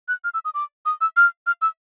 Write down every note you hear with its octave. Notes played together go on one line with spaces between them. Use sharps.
F#6
F6
E6
D#6
D6
D#6
E6
F6
F6
E6